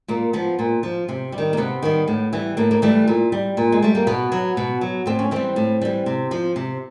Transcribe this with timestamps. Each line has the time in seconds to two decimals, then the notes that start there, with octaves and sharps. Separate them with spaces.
0.08 A#2 A#3
0.33 F3 B3
0.59 A#2
0.83 F3
1.09 C3
1.32 G3
1.38 D#3
1.53 A#3
1.57 C3 B3
1.82 D#3 G3
2.08 A2
2.33 E3 G3
2.57 A2 A#3
2.71 A#3
2.82 E3 G3 A3
3.08 A#2
3.32 G3
3.57 A#2
3.72 G#3
3.82 G3 A3
3.95 A#3
4.07 B2 B3
4.32 F#3
4.57 B2
4.81 F#3
5.06 A2 C4
5.19 C#4
5.31 E3 G3 C4
5.56 A2
5.81 E3 G3
6.06 C3
6.31 F3
6.56 C3